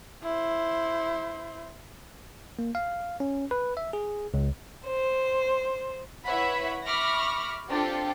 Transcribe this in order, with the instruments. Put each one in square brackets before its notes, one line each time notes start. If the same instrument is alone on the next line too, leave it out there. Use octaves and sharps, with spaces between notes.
[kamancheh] E4 C5
[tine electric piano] A#3
F5
C#4
B4
E5
G#4
C#2
[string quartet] C5
[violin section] E4 B4 C#5 E5 F#5 B5
E5 B5 C#6 D6 F6 A#6
C4 D4 F4 G4 A4